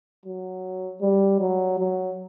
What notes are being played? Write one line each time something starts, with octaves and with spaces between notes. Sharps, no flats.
F#3
G3
F#3
F#3